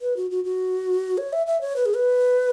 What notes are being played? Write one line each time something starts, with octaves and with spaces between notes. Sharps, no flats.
B4
F#4
F#4
F#4
C#5
E5
E5
C#5
B4
G#4
B4